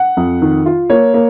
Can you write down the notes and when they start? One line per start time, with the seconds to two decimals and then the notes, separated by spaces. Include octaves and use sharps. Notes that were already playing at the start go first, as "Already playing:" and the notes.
Already playing: F#5
0.17 F2
0.42 D#3
0.66 F4
0.90 A#3 C#5
1.14 A#3